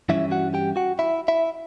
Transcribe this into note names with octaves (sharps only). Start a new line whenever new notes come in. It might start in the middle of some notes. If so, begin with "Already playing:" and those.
G2 E3 G3 C#4 E4 E5
F#4 F#5
G4 G5
F#4 F#5
E4 E5
E4 E5